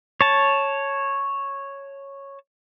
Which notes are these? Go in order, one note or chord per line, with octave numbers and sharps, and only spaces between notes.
C#5 A5